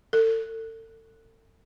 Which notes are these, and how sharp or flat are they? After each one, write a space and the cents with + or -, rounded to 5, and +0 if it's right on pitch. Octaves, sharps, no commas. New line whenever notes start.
A4 +35